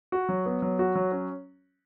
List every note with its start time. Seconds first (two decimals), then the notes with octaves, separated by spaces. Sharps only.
0.12 F#4
0.29 F#3
0.46 B3
0.62 F#3
0.79 F#4
0.96 F#3
1.12 C#4